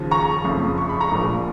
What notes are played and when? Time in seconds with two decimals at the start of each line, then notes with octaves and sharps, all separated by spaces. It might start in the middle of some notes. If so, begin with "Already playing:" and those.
Already playing: D#2 C#3 F3
0.11 A#5 C#6
0.44 F#1 F2 C#3 F3
0.78 C#6
0.89 B5
1.01 A#5 C#6
1.11 A#1 A#2 F3